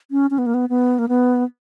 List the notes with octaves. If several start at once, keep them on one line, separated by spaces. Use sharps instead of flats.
C#4
C#4
B3
A#3
B3
B3
A#3
B3